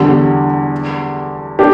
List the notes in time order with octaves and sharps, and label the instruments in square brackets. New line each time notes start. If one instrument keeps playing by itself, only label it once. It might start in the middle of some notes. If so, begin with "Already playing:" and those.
Already playing: [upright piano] E2 D3 G3 [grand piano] G4
[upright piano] D4 [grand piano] G4